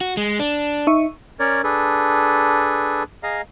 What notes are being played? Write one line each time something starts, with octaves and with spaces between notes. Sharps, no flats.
F#4
G#3
D4
D#4 E5 C#6
C#4 A#4 C#5 D5
D4 G#4 A4 B4
G#4 D#5 F5 A#5